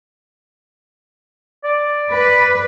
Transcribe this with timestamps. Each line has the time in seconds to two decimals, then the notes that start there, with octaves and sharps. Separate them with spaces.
1.64 D5
2.11 B4